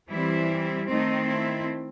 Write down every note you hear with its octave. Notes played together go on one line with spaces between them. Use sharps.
E3 G3 C4 E4
D#3 A3 C4 D#4
E4